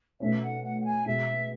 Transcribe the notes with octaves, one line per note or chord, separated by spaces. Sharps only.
B2 A3 C#4 E5
F#5
F#5
F#5
G#5
B2 G#3 B3 E5